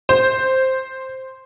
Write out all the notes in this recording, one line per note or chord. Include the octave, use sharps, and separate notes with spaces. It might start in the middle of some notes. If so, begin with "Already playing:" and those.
C5